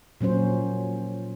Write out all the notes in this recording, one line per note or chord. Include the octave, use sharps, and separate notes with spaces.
A#2 F#3 C#4 C5